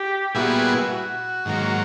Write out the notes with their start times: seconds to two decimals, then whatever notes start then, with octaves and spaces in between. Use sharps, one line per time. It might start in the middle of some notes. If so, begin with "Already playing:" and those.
Already playing: G4
0.35 A#2 G3 B3 E4 F#4 G#4
0.91 F#4
1.45 G#2 D#3 F#3 A#3